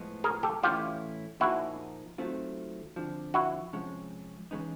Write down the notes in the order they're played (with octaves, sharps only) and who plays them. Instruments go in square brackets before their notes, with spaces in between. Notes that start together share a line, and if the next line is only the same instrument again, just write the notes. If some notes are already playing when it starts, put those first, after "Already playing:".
Already playing: [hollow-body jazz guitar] A2 F3 G#3 B3
[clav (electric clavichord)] G#4 A#4
G4 A4
[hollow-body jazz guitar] A2 E3 A3 C#4 E4 [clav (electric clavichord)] F4 G4
[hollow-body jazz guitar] A#2 F3 A#3 D#4 G#4 [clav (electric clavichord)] E4 F#4
[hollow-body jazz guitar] D#3 F#3 A3 C4 F4
F2 D3 F3
[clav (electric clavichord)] E4 F#4
[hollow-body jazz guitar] C3 F3 G#3 C#4
C#3 E3 G#3 B3 D#4